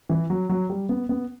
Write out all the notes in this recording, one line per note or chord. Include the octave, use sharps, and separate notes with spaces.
E3
F#3
F#3
G3
B3
B3